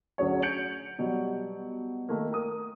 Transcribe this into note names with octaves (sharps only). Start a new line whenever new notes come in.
D2 F#3 C#4 G#4 C#5
G6 C#7 D7 F7 F#7
B2 F#3 G3
D#3 A3 A#3
A#4 D#6